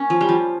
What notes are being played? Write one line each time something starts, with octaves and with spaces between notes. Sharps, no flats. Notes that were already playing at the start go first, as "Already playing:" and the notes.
Already playing: A#3 C#4
F3
G3
F3